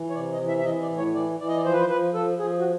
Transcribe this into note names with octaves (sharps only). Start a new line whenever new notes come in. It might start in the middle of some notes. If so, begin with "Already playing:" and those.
Already playing: E3
C#5
C3 D5
D#5
E3
E5
E5
E3 D#5
D5
A2
C#5
E3 D5
E3 D5
D#5
D5
F3 C5
B4
C5
F3 B4
F3 A4
F3 G#4
F#4